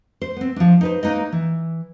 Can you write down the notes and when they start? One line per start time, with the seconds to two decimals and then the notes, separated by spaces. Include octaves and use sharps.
0.22 C5
0.37 B3 C4
0.56 F3 D4
0.81 D#4 B4 C5
1.03 A#3 D#4 B4 D#5
1.32 E3